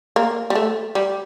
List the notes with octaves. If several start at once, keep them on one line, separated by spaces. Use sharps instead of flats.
A#3
G3
A3
G3